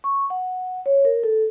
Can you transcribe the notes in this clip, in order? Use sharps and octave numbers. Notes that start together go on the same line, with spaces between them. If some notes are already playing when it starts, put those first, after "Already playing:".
C#6
F#5
C#5
A#4
A4